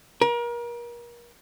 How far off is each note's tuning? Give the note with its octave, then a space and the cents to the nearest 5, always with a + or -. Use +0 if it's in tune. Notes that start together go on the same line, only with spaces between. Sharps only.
A#4 +35